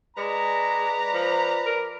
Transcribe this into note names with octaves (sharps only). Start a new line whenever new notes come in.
G#3 B4 D5 A#5
F3
A#4